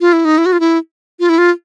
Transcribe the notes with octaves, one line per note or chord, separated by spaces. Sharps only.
F4
E4
D#4
E4
F#4
F4
E4
F4
E4
F4